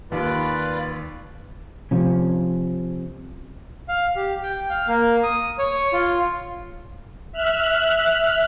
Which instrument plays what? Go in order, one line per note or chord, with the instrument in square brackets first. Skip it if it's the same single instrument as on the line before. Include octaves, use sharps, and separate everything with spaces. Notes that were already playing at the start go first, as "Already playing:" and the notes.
[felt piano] D#2 [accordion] F4 B4 D5
[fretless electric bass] C3 F3 C#4
[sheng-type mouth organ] F5
G4
G5
F5
A#3
D#6
C#5
F4
[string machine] E5 F6 F#6